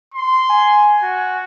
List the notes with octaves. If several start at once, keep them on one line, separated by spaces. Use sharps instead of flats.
C6
G#5
F#4